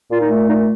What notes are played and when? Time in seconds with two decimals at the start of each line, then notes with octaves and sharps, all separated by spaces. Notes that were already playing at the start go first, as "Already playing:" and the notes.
0.09 A#2 F4
0.19 D#4
0.29 A3
0.48 A#2 D#4